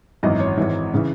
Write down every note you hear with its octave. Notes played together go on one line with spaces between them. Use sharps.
G#1 F#2 E3 D#5
C#5
G#1 G#2 E3
C#3 E3